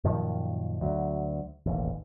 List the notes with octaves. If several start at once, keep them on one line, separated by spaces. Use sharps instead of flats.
F#2 A#2 D#3 F3
D2 F#3
E1 A1 D#2